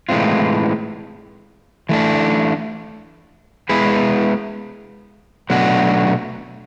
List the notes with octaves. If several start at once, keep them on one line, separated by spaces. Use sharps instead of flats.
A2 E3 G#3 C4 F4
E3 A3 D4
G#3 B3 E4 G#4 B4
B2 F#3 A3 D4 F#4